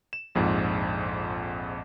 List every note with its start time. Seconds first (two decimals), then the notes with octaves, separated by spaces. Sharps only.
0.13 E7
0.35 A#1 F2 G#2